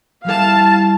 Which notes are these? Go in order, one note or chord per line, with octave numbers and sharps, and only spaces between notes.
F3 G3 E4 F5 A5